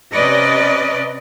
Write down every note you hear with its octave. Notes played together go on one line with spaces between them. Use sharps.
C3 C#4 B4 D5 D#5